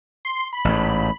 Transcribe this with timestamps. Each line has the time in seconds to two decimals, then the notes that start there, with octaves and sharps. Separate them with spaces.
0.25 C6
0.53 B5
0.65 A1 G#2